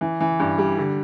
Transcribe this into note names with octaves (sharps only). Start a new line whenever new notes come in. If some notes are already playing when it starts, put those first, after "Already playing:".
E3
E3
G2
G3
D3